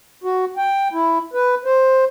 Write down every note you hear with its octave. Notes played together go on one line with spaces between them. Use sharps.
F#4
G5
E4
B4
C5